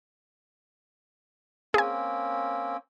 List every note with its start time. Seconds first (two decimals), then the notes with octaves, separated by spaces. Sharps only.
1.74 A#3 C4 C#4 G#4 G#5